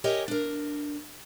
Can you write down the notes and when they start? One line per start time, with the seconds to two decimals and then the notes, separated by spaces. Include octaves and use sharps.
0.04 G4 A#4 C#5 D#5 E5 G#5
0.28 D4 A#4